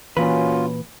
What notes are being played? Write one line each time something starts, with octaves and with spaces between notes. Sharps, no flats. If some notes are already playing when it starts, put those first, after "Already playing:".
A#2 E3 A#3 C#4 F4 F#4 B4